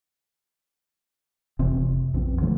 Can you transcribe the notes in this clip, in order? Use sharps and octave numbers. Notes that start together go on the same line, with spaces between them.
F1 C3 E3 C4
A#1 E2 C4
D3 F3 A3